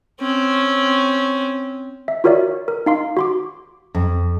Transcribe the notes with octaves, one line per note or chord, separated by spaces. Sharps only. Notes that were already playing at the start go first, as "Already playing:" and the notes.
C4 C#4
E5
F4 F#4 A#4 C#5 D5 E5
A#4
D#4 F5 C6
F#4 C6 D6
F2